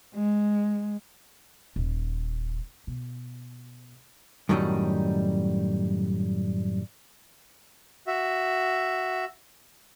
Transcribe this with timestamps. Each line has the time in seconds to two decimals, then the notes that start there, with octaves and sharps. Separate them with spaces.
0.14 G#3
1.76 D#1
2.87 B2
4.49 F#2 A2 D#3 F#3 G3 D#4
8.07 F#4 E5